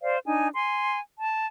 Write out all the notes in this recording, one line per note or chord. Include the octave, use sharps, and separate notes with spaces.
C5 D5 F5
D4 D#4 G#5
G#5 C6
A5